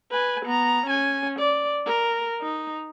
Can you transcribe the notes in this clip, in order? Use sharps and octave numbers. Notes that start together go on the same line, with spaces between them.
B4 G#5
B3 A#5
C#4 G#5
D5
A#4
D#4